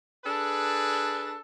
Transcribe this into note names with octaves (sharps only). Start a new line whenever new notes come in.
D4 G#4 A4 B4